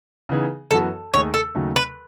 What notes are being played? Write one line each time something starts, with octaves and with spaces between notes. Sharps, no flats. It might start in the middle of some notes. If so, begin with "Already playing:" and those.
C#3 E3 B3 D#4 G#4
F#2 E3 B3 F#4 A4
D#2 D#3 A3 D#4 G#4 C#5
A4
D#2 C#3 F#3 A3 D#4
B4